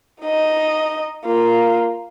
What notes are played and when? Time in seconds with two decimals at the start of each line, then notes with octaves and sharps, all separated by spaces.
0.22 D#4 D#5
1.26 A#3 F4